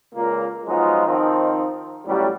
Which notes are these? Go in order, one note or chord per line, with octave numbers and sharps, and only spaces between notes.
C#2 A#2 A#3
F3 F#3 G#3 B3 D#4 F4
D#3 F3 C4 D#4
A1 A2 F#3 G3